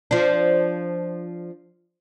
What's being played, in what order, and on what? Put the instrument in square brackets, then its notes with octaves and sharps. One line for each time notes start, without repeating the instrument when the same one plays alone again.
[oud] F3 D4